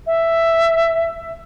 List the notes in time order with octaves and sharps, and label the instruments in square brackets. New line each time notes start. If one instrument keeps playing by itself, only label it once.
[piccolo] E5